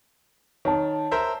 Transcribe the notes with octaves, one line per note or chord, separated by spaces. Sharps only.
D#3 C#5 A5
A#4 C5 E5